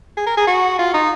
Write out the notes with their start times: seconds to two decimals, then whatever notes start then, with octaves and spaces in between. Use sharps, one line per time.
0.17 G#4
0.26 A#4
0.37 G#4
0.47 F#4
0.79 F4
0.94 D#4